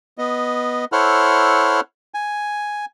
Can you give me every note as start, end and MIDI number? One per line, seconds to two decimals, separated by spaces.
0.18 0.85 59
0.18 0.85 75
0.92 1.81 64
0.92 1.81 69
0.92 1.81 72
0.92 1.81 73
0.92 1.81 78
0.92 1.81 89
2.14 2.85 80